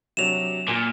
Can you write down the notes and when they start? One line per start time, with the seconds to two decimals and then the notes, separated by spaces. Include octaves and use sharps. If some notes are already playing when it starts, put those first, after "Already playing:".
0.17 C3 F#3 D4 E7 F7
0.68 A#2 G#5